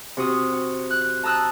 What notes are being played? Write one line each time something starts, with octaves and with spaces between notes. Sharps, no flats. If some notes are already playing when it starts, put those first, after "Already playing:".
C3 F#4 D#6
F#4
F#6
A5 A#5 D#6 E6 F#6